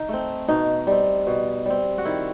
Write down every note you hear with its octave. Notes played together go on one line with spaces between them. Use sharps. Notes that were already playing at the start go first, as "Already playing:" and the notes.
Already playing: D#4
A3 C4
B2 D#4
G3 C4
B2
G3 C4
F#4
D#3 E4